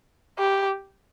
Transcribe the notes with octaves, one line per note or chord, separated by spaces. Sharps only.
G4